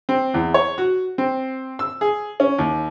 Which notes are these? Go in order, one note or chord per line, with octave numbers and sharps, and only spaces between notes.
C4
E2
C#5
F#4
C4
E6
G#4
C#4
D#2